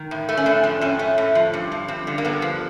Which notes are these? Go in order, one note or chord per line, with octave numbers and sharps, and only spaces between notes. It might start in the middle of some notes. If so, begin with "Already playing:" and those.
Already playing: D#3
A2
A3
C#4
A2 D4
F3
A2 C#4
A3
A2
F3
G2
F3
G2 C4
D3
A#3
G2 B3
F3